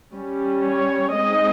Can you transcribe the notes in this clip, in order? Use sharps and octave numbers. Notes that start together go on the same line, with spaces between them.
G3 C#4
C#5
G#3 C4 D#4 D#5